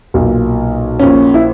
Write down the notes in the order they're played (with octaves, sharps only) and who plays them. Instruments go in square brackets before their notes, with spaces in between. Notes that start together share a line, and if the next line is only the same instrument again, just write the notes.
[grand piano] B1 A#2
A#1 A#2 C#4
E4